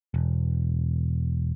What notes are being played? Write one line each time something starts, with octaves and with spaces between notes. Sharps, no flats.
E1